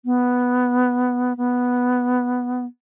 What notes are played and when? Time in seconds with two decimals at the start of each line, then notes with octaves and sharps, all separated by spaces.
0.05 B3
1.37 B3